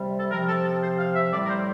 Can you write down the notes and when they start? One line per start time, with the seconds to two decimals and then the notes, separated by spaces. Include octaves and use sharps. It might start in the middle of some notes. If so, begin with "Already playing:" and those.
Already playing: C3 G3
0.19 A4
0.32 C3 F3 A#4
0.49 A4
0.65 A4
0.83 C5
0.99 F5
1.16 E5
1.32 A2 G3 D5
1.45 A#4
1.50 C5